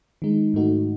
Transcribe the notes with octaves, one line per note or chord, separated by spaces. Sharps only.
D#3 G#3 D#4
G#2 D#3 A3 D#4 F#4